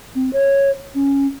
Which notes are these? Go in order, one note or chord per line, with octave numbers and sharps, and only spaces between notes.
C4
C#5
C#4